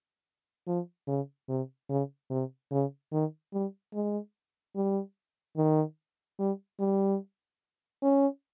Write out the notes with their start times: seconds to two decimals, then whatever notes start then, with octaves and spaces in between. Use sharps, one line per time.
0.67 F3
1.08 C#3
1.49 C3
1.89 C#3
2.30 C3
2.71 C#3
3.12 D#3
3.53 G3
3.94 G#3
4.76 G3
5.57 D#3
6.39 G3
6.80 G3
8.02 C#4